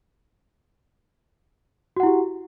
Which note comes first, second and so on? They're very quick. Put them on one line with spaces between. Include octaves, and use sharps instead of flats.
F#4 F#5 E4 G4